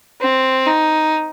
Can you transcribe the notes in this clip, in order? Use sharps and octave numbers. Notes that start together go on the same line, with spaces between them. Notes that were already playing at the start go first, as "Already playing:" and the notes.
C4
D#4